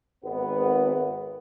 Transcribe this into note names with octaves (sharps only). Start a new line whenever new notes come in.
G#1 B3